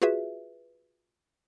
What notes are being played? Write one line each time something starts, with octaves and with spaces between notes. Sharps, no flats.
F4 F#4 G#4 B4 E5